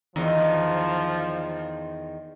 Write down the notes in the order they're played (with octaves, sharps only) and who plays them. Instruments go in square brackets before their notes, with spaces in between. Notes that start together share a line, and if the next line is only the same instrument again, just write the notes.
[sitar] E2 D#3 [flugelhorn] F3